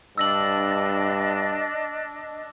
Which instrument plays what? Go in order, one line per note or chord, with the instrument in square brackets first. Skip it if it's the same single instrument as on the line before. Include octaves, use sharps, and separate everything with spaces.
[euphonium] G2 [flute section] D4 D#5 [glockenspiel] E6 A#6 F#7